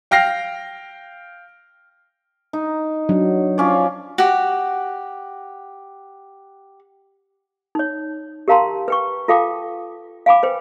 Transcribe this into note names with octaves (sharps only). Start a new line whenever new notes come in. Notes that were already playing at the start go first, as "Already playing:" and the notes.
F5 G5 F6 A#6 C7
D#4
F#3 D4
F3 C#4 D5
F#4 G4
D#4 C#5
G4 A#4 F5 A5 A#5 C6
B4 G5 C#6
F4 A4 F5 G5 A5 D6
F5 G#5 B5 D6
B4 C5 G5